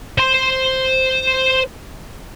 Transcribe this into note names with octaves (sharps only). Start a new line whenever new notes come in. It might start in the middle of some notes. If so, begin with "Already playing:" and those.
C5 C6